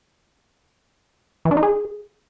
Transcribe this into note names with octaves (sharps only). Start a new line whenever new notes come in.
E3
D4
D#4
G#4